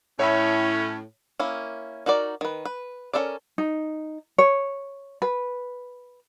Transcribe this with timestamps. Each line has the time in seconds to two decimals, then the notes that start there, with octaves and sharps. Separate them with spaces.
0.19 A2 C#4 C#5 E5 B5
1.40 A#3 C#4 E4
2.06 D#4 F#4 A#4 D5
2.41 D#3 B4
2.65 B4
3.14 C#4 E4 A4 A#4 D5
3.58 D#4
4.38 C#5
5.22 B4